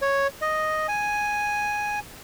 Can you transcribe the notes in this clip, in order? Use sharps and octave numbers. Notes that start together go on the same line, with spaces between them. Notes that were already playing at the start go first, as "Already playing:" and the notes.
C#5
D#5
G#5